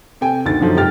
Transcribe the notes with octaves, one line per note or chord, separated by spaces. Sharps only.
C3 A4 G5 G#5
D2 D#3 A6
F#2 D3 D#3 F3 F#3
F1 G#2 G4 G5 F6 A6